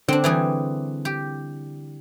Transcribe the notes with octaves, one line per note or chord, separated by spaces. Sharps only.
D3 C4 D4
E3 G3 G#4
G4